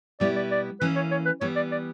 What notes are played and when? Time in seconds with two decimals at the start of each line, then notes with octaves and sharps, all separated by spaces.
0.20 B2 G3 B3 E4 D5
0.37 D5
0.51 D5
0.80 E3 A#3 C#4 B4
0.96 C#5
1.11 C#5
1.26 B4
1.41 E3 G3 B3 C#5
1.56 D5
1.72 D5